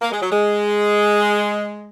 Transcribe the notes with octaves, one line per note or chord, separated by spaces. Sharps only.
A#3
G#3
F#3
G#3